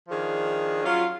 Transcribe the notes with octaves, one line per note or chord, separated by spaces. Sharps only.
D#3 F3 D4 G#4
F#3 C#4 F4